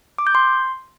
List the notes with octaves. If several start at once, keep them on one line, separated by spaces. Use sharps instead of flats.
D6
G6
C6